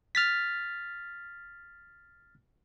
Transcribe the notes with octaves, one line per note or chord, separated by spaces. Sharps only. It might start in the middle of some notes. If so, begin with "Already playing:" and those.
F6 A6 B6